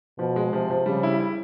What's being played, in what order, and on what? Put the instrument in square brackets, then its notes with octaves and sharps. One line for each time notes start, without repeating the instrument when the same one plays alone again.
[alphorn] B2 [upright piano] F3
[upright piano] G#3
[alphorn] C3 [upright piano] F3
[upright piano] F3
[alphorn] C#3 [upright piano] G3
[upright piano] E4
E4